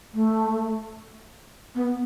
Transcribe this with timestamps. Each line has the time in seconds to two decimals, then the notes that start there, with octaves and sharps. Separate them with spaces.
0.14 A3
1.75 B3